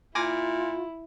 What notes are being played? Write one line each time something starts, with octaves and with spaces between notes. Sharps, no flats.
A#2 E4 F4 G#5 D6 A#6